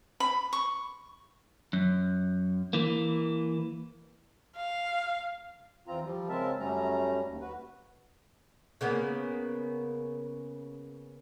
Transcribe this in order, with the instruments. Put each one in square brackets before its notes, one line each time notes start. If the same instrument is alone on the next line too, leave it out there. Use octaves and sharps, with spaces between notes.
[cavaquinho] B5
C#6
[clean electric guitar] F#2
E3 A#3
[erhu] F5
[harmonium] E2 C4 F4 A#5
F3 G3
C#3 G#3 C4 A#4 E5 A5
F#2 F#3 G3 A3 C#4 A#5
D#2
F#4 B4
[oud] C#3 A#3 B3